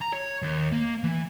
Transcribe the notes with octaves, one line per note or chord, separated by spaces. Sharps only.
A#5
C#5
D#2
A#3
E3